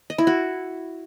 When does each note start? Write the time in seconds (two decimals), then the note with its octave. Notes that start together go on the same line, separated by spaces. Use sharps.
0.10 D#5
0.18 E4
0.27 F#4